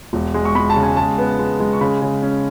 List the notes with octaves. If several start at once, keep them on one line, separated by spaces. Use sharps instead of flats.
E1
G#3
C#6
G#3 B5
A5
C#3
G#5
G#3 A5
B3
G#3
G#3
C#6
C#3 B5
C#3
C#4